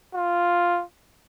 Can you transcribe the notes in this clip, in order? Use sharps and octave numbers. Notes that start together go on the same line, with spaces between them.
F4